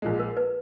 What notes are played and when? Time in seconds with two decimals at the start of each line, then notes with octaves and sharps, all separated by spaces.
0.02 A#1 A#2 G#3
0.19 A#4
0.37 B4